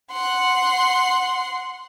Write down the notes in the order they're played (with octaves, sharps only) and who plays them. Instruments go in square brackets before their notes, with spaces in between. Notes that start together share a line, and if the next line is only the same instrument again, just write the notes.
[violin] F#5 C6